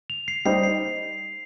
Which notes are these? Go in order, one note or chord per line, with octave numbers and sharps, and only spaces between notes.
F7
C7
G3 D#4 C5 C7
C7